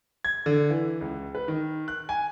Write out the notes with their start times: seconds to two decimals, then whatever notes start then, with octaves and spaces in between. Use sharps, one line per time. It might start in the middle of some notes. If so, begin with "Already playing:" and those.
0.25 G#6
0.46 D3
0.70 E3
1.01 C#2
1.35 B4
1.48 D#3
1.88 F#6
2.09 G#5